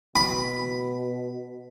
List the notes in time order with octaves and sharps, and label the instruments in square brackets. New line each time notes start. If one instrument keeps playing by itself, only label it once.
[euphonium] B2 [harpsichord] B5